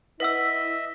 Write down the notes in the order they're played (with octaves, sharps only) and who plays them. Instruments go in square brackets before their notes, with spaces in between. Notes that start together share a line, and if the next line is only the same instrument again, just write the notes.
[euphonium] E4 [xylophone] B4 F#5 E6 [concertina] D#5 E5